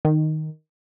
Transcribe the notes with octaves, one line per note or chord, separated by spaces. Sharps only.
D#3